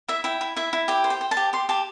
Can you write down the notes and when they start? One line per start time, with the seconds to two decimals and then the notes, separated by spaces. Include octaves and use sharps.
0.08 E4 E5
0.24 E4 G5
0.41 E4
0.56 E4 E5
0.73 E4
0.88 G4 G5
1.04 C5
1.10 G5
1.21 C5
1.31 A5
1.37 G4
1.53 G4 C6
1.69 G4 A5